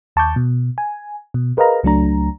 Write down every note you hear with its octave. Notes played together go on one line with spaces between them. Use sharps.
D#2 A5 C#6 D6 G6
B2
G#5
B2
G#4 A#4 B4 D#5 F5 A#5
C#2 F#3 A3 D4 A#5